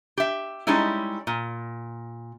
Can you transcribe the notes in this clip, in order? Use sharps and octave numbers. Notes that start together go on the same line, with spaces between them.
G4 E5
G3 G#3 C#4 D#4 E4
A#2